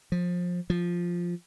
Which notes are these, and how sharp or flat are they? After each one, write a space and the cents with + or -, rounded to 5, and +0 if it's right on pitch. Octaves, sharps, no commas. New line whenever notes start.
F3 +20
F3 +0